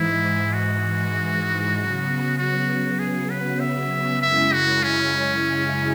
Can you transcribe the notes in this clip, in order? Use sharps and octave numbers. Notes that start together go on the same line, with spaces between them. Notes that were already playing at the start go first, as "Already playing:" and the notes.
Already playing: G#2 E3 G#3 E4
F#4
C#3 F#3 B3
F#4
G#4
B4
E5
F#2 C#3 G#3 E4 E5
F#4
C#4